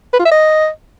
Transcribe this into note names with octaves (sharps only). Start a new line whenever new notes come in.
B4
F4
E5
D#5